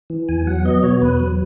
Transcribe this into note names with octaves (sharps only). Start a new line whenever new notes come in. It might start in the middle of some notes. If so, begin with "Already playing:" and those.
E3
E2 G#5
F#3 F#5
B3 D#5
B2 C#5
E2 B4
F#3